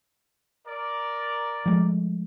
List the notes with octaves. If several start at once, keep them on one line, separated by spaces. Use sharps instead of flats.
A#4 D5
F3 G#3 A3